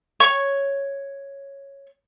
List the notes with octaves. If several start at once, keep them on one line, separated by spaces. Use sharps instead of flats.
C#5 C#6